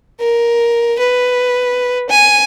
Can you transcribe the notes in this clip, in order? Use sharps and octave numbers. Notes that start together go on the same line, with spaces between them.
A#4
B4
G#5